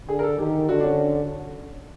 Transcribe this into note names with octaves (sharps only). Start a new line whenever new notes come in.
D3 G#4
A#4
A4
D#3 G4
D3 F#4
D4
C#4